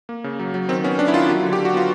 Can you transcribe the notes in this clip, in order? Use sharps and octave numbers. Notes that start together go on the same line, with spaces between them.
A#3
C#3
F#3
F#3
D#3 C4
B3 C#4
D#3 D4
E4
D#3 F4
F#3
D3
G4
D3
F#4
B3 F4